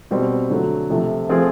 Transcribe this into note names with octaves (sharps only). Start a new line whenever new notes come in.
B2 G3 C4
D3 F#3 A3
C3 F3 A3
F3 A3 C4 F4 G#4